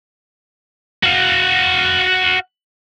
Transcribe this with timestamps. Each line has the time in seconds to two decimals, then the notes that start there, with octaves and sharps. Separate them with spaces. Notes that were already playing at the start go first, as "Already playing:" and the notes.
1.03 F#4 F5